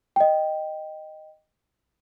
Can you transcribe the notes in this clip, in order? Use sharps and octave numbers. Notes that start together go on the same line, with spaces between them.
D#5 G5